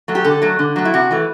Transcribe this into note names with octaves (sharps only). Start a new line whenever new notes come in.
F#3 A3
G4
D3 A4
F#3 A3
D3
F#3 A3
E4
C3 F#4
E3 A3